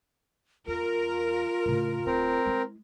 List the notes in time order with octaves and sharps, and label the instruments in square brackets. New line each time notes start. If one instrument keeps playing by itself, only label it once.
[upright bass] E2 [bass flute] F4 [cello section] A#4
[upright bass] A2 C#3
[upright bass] D1 [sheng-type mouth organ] C4 A#4
[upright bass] G#3 E4